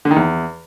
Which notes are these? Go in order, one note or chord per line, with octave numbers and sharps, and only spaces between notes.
D3
D#3
E2